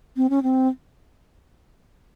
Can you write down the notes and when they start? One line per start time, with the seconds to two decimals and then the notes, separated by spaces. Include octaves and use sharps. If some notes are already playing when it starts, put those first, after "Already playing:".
0.17 C4
0.30 C#4
0.43 C4